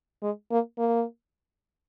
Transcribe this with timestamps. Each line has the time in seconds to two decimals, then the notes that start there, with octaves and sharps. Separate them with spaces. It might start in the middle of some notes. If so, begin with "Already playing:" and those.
0.22 G#3
0.51 A#3
0.78 A#3